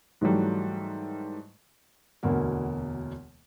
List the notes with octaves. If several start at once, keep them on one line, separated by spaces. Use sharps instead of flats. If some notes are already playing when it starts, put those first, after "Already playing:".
G#2 E3 F#3 G3 A3
E1 D2 B2 D3 A#3